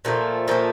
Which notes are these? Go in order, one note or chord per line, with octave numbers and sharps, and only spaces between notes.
A#2 F3 A3
A#2 F3 A3